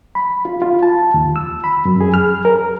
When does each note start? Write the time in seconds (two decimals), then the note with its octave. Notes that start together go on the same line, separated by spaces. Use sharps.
0.15 B5
0.45 F4
0.62 F4
0.83 A5
1.14 D#2
1.36 E6
1.64 B5
1.85 F#2
2.01 G#4
2.14 F6
2.45 A#4